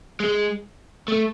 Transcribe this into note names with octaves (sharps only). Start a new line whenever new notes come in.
G#3
A3